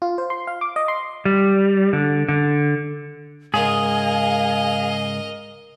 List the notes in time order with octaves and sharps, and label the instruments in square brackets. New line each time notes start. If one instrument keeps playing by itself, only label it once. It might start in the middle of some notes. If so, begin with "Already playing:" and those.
[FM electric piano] F4
C5
C6
F5
D6
D#5
C6
[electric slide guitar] G3
D3
D3
[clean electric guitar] C#2 G#2 [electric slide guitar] G#4 [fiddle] A#4 D#5 [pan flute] F5